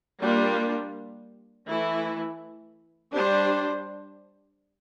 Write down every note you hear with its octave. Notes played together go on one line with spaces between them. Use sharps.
G3 A#3 D4 F4
E3 A3 E4
G3 D4 G4 C5